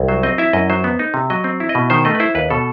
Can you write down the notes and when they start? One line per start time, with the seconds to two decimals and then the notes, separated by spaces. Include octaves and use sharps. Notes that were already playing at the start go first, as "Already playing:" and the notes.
Already playing: C2
0.08 F#3 C5
0.23 C4 D#5
0.38 E4 E5
0.53 F#2 D#5
0.70 F#3 C5
0.84 B3
0.99 D#4
1.14 C3
1.30 F#3 D#5
1.44 C4
1.60 E4
1.69 D#5
1.75 B2
1.90 D#3 C5
2.05 A3 D#5
2.15 B4
2.20 E4 C5
2.35 D#2 B4
2.50 B2 A4